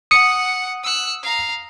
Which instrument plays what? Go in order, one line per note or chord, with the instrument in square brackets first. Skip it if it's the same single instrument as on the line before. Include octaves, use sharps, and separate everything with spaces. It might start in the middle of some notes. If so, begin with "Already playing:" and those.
[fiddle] F#5 [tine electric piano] D#6 C#7
[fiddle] E6 F#6
F5 A#5